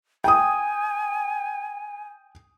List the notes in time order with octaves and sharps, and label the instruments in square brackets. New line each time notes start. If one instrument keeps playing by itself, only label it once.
[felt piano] G5 D#6 [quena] G#5